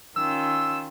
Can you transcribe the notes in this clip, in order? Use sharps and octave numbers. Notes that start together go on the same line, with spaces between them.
D#3 C#4 F4 E6